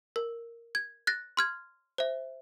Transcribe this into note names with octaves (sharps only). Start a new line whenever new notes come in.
A#4
G#6
F#6 A6 A#6
C6 F6 G#6
C5 E5